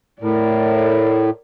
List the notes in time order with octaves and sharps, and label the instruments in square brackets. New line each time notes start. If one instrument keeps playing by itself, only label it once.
[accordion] A2 [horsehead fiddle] A#4 D5